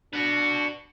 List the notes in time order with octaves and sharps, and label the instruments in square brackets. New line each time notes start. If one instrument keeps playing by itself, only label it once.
[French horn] D4 [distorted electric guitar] F#4 B4